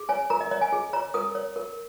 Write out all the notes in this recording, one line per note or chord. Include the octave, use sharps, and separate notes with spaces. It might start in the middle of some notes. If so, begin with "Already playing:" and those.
Already playing: G#4
C#5 G#5
A#4 A#5
D#5
C#5 D#5
G#5
G#4
C#5 A#5
A#4 D#6
C#5
A#4